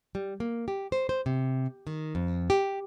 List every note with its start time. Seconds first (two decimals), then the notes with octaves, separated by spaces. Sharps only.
0.15 G3
0.40 A#3
0.68 G4
0.92 C5
1.09 C5
1.26 C3
1.87 D#3
2.15 F2
2.50 G4